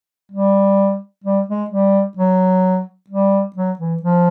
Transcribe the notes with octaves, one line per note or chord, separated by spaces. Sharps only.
G3
G3
G#3
G3
F#3
G3
F#3
E3
F3